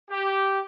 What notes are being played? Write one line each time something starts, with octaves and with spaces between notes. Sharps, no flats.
G4